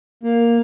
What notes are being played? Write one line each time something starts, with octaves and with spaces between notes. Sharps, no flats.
A#3